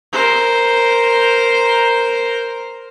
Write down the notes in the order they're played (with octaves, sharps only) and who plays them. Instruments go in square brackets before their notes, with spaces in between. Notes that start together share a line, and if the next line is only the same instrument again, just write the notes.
[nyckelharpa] A#4 C5